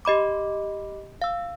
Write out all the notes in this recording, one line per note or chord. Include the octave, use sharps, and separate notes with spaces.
G4 D#5 B5 D6
F5 E6